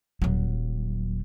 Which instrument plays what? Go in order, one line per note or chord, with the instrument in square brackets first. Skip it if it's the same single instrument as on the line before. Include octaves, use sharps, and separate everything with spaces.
[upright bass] D#1 F#3